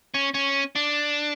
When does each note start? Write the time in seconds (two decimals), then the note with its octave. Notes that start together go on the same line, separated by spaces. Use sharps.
0.14 C#4
0.34 C#4
0.76 D4